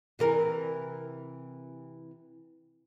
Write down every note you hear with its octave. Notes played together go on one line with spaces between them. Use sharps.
C3 E3 A#4